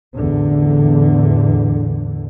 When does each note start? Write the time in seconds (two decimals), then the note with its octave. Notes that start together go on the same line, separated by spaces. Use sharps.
0.15 A1 E2 D3